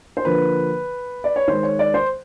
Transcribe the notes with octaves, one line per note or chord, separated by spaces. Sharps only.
C5
D3 F3 A#3 B4
D5
C#5
D#3 G#3 C5
C#5
D5
C5